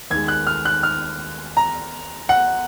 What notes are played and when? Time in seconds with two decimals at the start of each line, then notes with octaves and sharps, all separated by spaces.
0.10 D#2 D#3 G#3 G#6
0.28 F#6
0.47 F6
0.65 F#6
0.83 F6
1.57 A#5
2.29 F#5